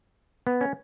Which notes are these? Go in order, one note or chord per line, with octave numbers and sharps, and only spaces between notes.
B3
C#4